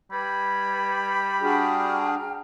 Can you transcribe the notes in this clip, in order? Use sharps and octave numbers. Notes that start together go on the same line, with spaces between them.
G3 B4 B5 G#6
D4 F#4 G#4 G5 A#5 F6